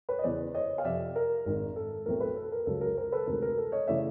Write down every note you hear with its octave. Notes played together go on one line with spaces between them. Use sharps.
B4 C#5
D#5
E2 C#3 E3 C5 D5
C#5 D#5
F5
F2 C3 F3 D5 E5
A#4
G#1 G#2 D#3 A#4
A4
B1 A2 E3 A3 C4 A#4
A4 B4
A4
A#4
C#2 C#3 F#3 A4
A#4
A#4 C5
A4 B4
D2 C3 D#3 G#3 A#4
A#4
A4
C#5 D#5
C#3 E3 A3 D5 E5